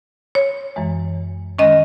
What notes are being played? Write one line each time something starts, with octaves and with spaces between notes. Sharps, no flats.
C#5
F#2 E3 G#3
D#3 G#3 C#4 D#5